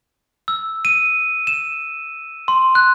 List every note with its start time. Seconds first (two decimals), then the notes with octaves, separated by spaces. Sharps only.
0.48 E6
0.85 D#7
1.47 E7
2.48 C6
2.75 F#6